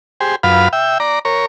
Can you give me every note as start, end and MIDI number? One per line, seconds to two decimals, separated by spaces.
0.20 0.36 67
0.20 0.36 68
0.20 0.36 72
0.43 0.68 42
0.43 0.68 65
0.43 0.68 71
0.43 0.68 77
0.43 0.68 83
0.73 0.98 76
0.73 0.98 79
1.00 1.19 74
1.00 1.19 82
1.25 1.46 70
1.25 1.46 73